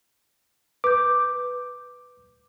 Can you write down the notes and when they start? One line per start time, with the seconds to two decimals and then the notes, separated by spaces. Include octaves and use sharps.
0.84 B4 D6 G6